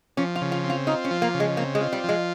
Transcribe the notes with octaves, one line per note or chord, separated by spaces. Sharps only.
F3 C#4
F4
C#3
F4
C4
F4
D#4 F4
C#4
F3
A#3
C#3
G#3
A#3 C4
G#3
F4
G3
F3 G#3